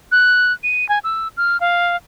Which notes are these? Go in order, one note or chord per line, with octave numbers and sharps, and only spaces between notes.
F#6
D#7
G#5
E6
F6
F5